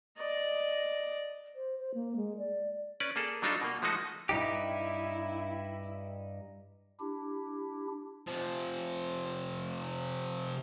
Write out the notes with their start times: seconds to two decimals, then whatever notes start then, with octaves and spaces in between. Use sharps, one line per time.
0.17 D5 D#5
1.56 C5
1.79 C5
1.94 A#3
2.16 G#3
2.38 D5
3.00 C#4 B4 D5
3.16 A#3 G#4 A4
3.42 F#3 G3 D4 D#4 F4 A4
3.61 B2 A#3
3.82 F3 G#3 A3 D#4 F#4
4.29 G2 D#4 E4 G4
7.00 D4 E4 G4
8.27 C3 F3